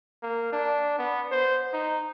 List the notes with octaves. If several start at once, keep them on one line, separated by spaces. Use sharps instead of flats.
A#3
D4
B3
C5
D#4